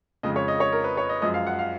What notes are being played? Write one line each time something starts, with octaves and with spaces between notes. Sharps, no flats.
F2 C#3 F3 G#3 D#5
C#5
D#5
C#5
A#4
B4
C#5
D#5
F#2 F3 G#3 D#5
F5
F#5
F5